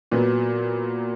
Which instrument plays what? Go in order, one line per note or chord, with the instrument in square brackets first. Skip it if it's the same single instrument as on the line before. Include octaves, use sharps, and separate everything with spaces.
[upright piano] A#2 F#3 B3